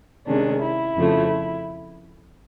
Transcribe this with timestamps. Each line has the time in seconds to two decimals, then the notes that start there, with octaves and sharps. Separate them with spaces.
0.27 C3 D#3 G#3 C#4 D4
0.62 E4
0.96 F2 C#3 F3 A3